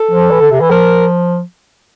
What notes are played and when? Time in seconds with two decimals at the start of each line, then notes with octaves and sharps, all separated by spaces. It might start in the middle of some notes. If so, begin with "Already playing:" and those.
Already playing: A4
0.11 F3
0.31 E3
0.41 D3
0.51 C3
0.61 E3
0.70 F3 A#4